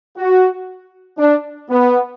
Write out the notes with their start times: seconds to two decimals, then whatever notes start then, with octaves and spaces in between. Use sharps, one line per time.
0.18 F#4
1.18 D4
1.70 B3